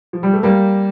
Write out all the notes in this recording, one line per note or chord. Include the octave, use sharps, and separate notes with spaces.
F3
G3
A3
G3 A#3